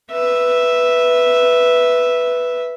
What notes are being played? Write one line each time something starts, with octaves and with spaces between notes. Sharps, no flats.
B4 E5